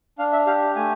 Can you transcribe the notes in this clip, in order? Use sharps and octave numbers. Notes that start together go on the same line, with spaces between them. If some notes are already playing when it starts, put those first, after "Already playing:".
D4 F5
E5
G4 F5
A3 G#5